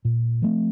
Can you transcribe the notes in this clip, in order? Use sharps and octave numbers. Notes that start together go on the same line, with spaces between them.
A#2
F3 A3 C4